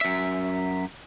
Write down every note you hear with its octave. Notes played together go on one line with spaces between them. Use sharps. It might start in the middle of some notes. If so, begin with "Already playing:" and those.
F#2 E5